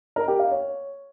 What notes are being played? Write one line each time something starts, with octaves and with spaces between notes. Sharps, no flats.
A#4
G4
F5
C#5